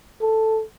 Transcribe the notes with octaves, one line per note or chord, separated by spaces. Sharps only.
A4